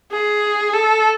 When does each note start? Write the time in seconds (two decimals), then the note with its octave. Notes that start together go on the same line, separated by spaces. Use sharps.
0.12 G#4
0.74 A4